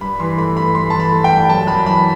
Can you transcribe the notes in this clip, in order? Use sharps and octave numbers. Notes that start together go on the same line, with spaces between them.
G2 B5
E3 C6
A3 B5
G2 B5
A3 C6
E3 A5
B5
A3
G5
G2
F#2 A5
F#2 B5
E3 B5